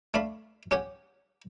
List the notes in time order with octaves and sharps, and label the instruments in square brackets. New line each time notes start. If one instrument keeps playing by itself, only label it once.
[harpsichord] A3 D4 F5 B5
C#4 G4 F#5 G#5